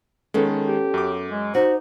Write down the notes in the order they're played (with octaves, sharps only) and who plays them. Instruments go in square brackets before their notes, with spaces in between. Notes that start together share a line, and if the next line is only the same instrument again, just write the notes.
[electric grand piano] D#3 G#3 [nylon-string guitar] B3 C#4 A4
[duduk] G4
[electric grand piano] F#2 D6
[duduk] G#3
[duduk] D#4 [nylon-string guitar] F#4 [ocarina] C5